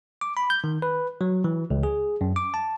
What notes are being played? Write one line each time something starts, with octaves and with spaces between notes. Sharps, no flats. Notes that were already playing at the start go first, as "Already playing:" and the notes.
D6
B5
G6
D#3
B4
F#3
E3
C#2
G#4
F#2
D6
A5